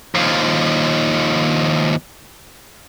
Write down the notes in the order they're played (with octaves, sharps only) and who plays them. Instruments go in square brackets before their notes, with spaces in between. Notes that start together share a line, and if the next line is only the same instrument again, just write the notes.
[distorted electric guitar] D#2 F3